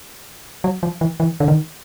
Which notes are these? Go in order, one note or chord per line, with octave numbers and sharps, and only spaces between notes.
F#3
F3
E3
E3
D3
D#3